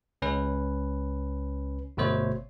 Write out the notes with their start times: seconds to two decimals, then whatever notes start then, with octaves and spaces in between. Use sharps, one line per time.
0.22 C#2 C#4 B4
1.97 G1 B2 A3 C5 C#5